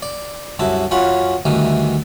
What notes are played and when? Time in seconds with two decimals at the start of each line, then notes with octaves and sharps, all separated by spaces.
0.03 D5
0.59 C2 F#2 E4 A5
0.91 F#2 C#4 F4 F#5 B5
1.45 D2 D#3 E3 G3